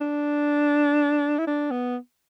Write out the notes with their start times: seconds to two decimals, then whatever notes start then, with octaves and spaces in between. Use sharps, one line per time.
0.01 D4
1.39 E4
1.47 D4
1.71 B3